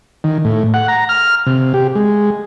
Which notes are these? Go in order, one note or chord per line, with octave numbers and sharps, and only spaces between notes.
D#3
A2
F#5
A#5
F6
C3
G4
G#3